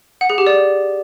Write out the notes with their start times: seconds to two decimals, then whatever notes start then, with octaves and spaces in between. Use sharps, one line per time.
0.21 F#5
0.30 G#4
0.38 G4
0.47 D5